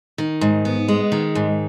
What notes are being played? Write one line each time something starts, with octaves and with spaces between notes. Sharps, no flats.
D#3
G#2
B3
G#3
D#3
G#2